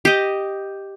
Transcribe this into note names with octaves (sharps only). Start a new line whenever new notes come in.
G4 D#5